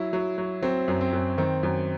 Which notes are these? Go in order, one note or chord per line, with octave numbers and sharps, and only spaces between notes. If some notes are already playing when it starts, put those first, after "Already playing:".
Already playing: F#3 E4
F#3
F#3
F#3 C4
F#2
C4
F#2
D#3 C4
F#2